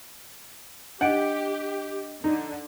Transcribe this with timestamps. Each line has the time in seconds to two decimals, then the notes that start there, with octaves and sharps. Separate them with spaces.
1.01 D4 G4 D#5 F#5 D7
2.24 D3 D#4